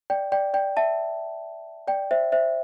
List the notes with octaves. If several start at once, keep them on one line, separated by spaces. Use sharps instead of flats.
D5 G5
D5 G5
D5 G5
E5 A5
D5 G5
C5 E5
C5 E5